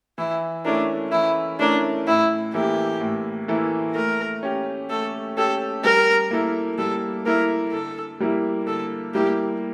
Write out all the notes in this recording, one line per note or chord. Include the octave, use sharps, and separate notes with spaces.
E3 E4
A3 C#4 D4 E4 A#4
E3 E4
A3 C#4 D4 E4 A#4
A2 E4
E3 A#3 E4 G4 A4
A2
E3 A#3 E4 A4
A3 A#4
C#4 G4
A3 A4
C#4 G4 A4
G3 A#4
A#3 E4 A4
G3 A4
A#3 E4 A4 A#4
D3 A4
G3 A#3 E4
D3 A4
G3 A#3 E4 G4